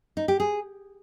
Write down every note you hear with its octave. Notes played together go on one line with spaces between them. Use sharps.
D#4
G4
G#4